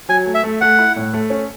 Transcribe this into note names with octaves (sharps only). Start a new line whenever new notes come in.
F#3 G#5
A3
E5
A3
A3 F#5
E4
A2
A3
C#4